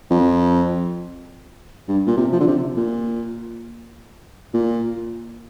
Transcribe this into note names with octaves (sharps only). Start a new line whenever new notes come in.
F2
G2
A#2
C3
F3
D3
C3
A#2
A#2